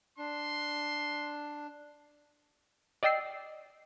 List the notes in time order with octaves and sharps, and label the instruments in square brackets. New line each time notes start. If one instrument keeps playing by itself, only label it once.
[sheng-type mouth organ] D4 [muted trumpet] C6
[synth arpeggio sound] D5 D#5 G5 E6 C7